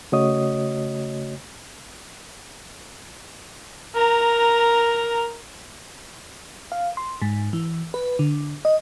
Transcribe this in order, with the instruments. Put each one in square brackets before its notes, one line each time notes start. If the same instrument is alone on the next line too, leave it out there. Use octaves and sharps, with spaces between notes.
[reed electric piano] C#3 A3 F#4 C#5 D#5 D#6
[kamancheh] A#4 A#5
[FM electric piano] F5
C6
G#2
E3
B4
D3
D#5